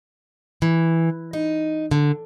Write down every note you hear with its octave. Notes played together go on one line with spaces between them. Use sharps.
E3
D#4
D3